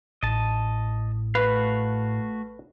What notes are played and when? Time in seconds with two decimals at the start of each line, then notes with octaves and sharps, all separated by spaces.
0.23 A1 A2 D#5 A5
1.35 A3 F#4 B4 F5